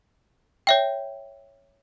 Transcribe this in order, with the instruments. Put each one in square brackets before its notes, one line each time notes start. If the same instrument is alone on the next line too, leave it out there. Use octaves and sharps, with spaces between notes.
[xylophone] C#5 E5 G5